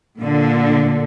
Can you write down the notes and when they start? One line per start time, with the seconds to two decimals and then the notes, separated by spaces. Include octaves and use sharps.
0.20 A#2 D3